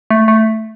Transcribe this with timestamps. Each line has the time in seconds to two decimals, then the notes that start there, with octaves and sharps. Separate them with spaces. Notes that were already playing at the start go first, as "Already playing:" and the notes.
0.11 A3
0.28 A3